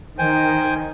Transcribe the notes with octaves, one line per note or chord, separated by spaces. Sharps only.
D#3 C5 G5 G#5